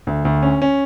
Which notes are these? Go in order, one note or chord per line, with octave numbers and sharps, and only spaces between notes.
D2
D2
C#4
C#4